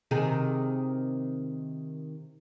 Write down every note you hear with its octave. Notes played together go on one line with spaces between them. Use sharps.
C3 D#3 G#4